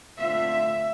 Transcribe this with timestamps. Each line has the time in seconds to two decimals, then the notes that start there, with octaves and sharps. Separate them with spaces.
0.18 D3 A3 C4 F4 E5